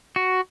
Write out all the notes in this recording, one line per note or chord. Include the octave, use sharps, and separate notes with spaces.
F#4